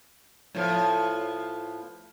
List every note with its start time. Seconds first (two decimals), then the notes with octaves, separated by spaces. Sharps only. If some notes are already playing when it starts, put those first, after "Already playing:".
0.55 A2 F3 B3